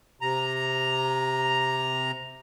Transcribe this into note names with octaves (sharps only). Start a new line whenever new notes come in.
C3 A#5